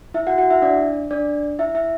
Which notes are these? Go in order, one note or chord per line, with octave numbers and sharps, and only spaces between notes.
E4 E5
F#4 F#5
F#4 F#5
E4 E5
D4 D5
D4 D5
E4 E5
E4 E5